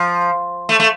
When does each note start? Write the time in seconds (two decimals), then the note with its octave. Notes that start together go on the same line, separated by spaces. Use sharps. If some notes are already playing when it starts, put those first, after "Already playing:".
Already playing: F3
0.69 A3
0.80 A3